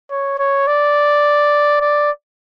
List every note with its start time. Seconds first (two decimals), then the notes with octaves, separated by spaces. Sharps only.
0.10 C#5
0.38 C#5
0.67 D5
1.81 D5